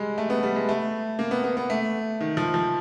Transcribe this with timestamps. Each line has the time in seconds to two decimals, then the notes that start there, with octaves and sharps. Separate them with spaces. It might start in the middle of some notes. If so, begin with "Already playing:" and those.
Already playing: G3 G#3
0.18 A3
0.30 B3
0.43 G3
0.56 G#3
0.69 A3
1.19 A#3
1.31 B3
1.44 B3
1.57 B3
1.70 A3
2.21 D#3
2.37 F3
2.54 F3